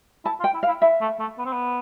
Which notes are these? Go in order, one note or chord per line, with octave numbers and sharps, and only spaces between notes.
E4 A5
F4
G5
E4
F5
E4
E4 E5
A3
A3
B3
C4
B3